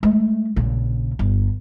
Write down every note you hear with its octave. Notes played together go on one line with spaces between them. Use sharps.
G#3 A3
A#1 C#3
G1